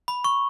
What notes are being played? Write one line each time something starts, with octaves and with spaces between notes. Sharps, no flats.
B5
C#6